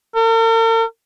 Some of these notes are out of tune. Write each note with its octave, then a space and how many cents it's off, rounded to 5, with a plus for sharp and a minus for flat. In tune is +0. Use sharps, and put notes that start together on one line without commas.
A#4 -45